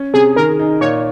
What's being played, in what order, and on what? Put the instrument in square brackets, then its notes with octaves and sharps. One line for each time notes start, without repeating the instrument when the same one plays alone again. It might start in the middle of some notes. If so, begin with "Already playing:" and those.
Already playing: [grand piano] C#4
[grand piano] C3 [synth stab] G#4
[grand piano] D#3 [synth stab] A#4
[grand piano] D#4
[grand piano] A#2 [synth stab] C#5